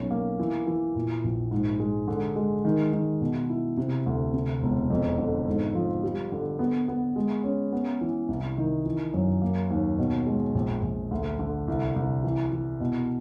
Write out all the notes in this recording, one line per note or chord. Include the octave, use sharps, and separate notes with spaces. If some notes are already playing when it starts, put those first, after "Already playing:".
Already playing: B1 C#4
A#3
E3
E3
A#2
A#1
G#2
G#3
D3
G#3
D#3
D#3
B2
E4
C3
D2
C3
E1
F2
D3
G#2
F3
G3
D3
B3
B3
G#3
C#4
B3
E3
C2
D#3
E3
F#2
A#3
D#2
B2
G#3
A#1
A#1
D2
D3
C2
C2
E3
E3
B2